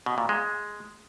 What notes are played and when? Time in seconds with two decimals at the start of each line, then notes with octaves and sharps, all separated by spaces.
0.06 B2
0.18 A#2
0.29 G#3